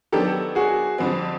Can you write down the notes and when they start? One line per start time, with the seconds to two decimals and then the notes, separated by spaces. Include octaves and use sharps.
0.12 D#3 F#3 B3 D4 G4 A4
0.55 F#4 G#4
0.98 F2 D3 G3 C4